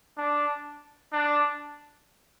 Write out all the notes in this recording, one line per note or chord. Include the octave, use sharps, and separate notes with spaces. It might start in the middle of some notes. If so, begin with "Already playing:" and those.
D4
D4